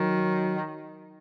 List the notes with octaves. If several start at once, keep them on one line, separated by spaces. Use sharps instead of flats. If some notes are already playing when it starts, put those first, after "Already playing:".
Already playing: D#3 F#3